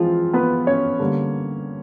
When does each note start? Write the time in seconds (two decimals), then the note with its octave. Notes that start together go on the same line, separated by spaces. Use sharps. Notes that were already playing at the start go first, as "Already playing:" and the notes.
Already playing: E3 F3 G#3 C4 F4
0.33 B3 B4
0.67 C#4 C#5
0.99 D3 G3 A#3